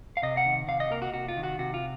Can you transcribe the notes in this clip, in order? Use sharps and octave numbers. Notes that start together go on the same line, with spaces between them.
F5
C3 D#5
F#5
D#3
C3 F5
D#5
A#3 A#4
F#4
C3 F#4
F4
D#3
F#4
C3 F#4
F4